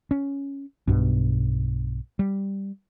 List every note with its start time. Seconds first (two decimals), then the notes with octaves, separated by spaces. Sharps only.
0.11 C#4
0.88 B1 G2 B2
2.19 G3